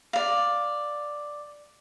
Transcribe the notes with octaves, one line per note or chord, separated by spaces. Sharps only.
D5 F5